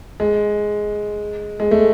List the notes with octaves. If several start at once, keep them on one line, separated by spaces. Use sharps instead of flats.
G#3
G#3
A3